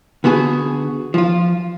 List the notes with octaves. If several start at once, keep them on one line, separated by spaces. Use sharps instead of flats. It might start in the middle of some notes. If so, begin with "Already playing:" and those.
D3 B3 F#4 G#4
F3 F4